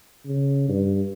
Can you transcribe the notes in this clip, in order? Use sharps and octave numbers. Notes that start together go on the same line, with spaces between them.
C#3
G2